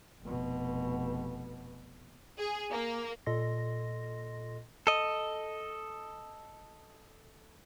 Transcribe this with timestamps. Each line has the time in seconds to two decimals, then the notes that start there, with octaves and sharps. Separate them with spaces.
0.23 F1 B2
2.38 G#4
2.71 A#3
3.26 A#2 A4 D#5 C6 A#6
4.87 A4 D#5